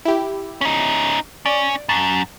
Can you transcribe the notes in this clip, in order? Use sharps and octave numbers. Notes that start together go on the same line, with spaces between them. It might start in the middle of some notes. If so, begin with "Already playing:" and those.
E4 G4
C#4 D#4
C#4 D5
F#2 A5